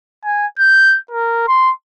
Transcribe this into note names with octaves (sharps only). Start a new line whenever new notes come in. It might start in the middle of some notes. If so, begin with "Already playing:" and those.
G#5
G6
A#4
C6